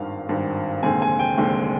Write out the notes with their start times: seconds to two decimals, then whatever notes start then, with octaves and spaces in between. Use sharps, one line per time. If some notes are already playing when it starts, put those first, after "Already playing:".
Already playing: G#1 G2 D#3 F5
0.29 G#1 G2 D#3
0.83 F1 D#2 D3 G#3 C4 G#5
1.02 G#5
1.19 G5
1.38 F1 D#2 D3 G#3 C4